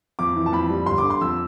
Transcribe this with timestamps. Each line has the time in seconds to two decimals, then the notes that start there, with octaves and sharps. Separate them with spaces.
0.19 F2 D6
0.36 E3
0.46 A5
0.53 F2 B5
0.70 G3
0.86 G1 C6
0.98 D6
1.04 D3
1.10 C6
1.21 F2 E6